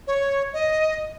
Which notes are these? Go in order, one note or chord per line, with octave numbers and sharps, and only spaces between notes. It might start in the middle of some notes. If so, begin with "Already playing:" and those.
C#5
D#5